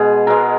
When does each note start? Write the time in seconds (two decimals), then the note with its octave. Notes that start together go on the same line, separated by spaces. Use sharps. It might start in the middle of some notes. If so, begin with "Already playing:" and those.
Already playing: B2 G#3 G#4
0.27 B2 G#3 A#4